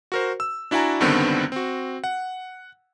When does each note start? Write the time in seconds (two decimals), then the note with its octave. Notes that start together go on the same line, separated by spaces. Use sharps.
0.12 F#4 A#4 C5
0.40 E6
0.71 D4 E4 F#4 D5 G#5 A#5
1.00 C#2 G2 D3 D#3 B3 C4
1.52 C4 F#4
2.04 F#5